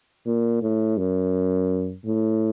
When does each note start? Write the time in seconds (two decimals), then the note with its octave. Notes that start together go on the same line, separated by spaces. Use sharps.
0.26 A#2
0.62 A2
0.98 F#2
2.06 A2